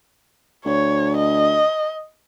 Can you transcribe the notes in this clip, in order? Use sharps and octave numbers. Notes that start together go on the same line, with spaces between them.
D2 C#5
D#5